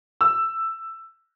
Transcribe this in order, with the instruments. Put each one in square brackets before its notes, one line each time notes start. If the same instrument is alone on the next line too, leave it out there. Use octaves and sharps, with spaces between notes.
[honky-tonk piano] E6